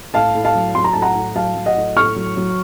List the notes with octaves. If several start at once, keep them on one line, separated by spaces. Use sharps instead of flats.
A2 F5 A5
A2
F5 A5
F#3
F#3 C6
A#5
A2 A5
F#5 A#5
A2
F#3 F5 A5
F#3
D#5 F#5
A2
A2 C#6 F6
F#3
F#3